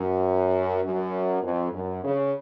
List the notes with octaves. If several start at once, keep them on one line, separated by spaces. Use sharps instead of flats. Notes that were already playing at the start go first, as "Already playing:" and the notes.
Already playing: F#2
F#2
F2
F#2
C#3